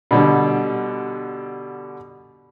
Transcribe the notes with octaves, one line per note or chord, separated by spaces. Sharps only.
B2 D3 G3